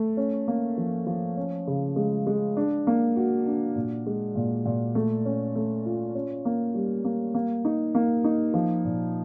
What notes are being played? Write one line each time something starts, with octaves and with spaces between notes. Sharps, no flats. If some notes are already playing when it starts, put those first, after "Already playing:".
Already playing: A3
C#4
A#3
F3
F3
C#4
C#3
G#3
G#3
D4
A#3
F#4
D4
A#2
G#3
A#2
A#2
A3
C#4
A3
F4
C#4
A#3
G3
A#3
A#3
D#4
A#3
D#4
F3
A#2